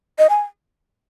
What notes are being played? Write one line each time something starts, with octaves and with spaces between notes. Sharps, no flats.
D#5
G#5